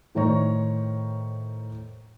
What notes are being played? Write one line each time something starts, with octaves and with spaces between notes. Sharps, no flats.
A2 D#3 C5 C#5 A#5 C#6